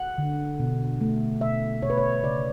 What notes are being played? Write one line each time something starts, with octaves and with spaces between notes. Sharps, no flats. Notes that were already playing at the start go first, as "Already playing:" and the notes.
Already playing: F#5
D3
B2
A3
B2 E5
B2 C#5
B4
C#5
C#3 D5